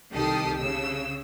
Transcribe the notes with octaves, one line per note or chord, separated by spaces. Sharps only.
C2 D#3 G4 A4 D#6 C7
C#3 E6